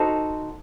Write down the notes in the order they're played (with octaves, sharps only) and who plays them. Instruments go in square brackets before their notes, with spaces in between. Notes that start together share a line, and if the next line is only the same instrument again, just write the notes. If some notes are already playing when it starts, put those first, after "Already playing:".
Already playing: [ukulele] D#4 F#4 A4 C5